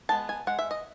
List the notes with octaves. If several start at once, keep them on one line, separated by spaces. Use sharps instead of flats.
G#3 B3 A5
G#5
G#3 F#5
E5
D#5